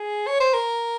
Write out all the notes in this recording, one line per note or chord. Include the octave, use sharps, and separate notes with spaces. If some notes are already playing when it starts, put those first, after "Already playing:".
Already playing: G#4
C#5
C5
A#4